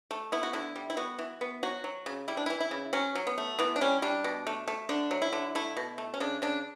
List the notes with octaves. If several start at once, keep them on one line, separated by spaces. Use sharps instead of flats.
A3
B3 E4
F#4
D3 E4
G3
E4
B3 F#4
E3
B3
F#3 F#4
F#3
C#3
G3 E4
D4
E3 E4
E4
C#3
F#3 C#4
F#3
B3
A3
E3 B3
D4
G3 C#4
G3 D4
B2
A3
A3
D3 D4
F#3
E4
D3
A3 E4
B2
A3
C#4
C#3 D4
C#3 D4